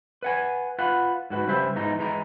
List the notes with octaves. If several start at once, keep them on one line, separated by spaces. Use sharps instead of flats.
B4 F#5 G#5
F4 B4 F#5
G#2 F#4 B4
C#3 G3 B4 C5 E5
E2 G#2 E3 D#4 A#5
E3 G#3 A#5